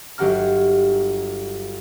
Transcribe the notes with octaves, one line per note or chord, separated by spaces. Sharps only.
G1 F#3 G4 F#5 A#5 F6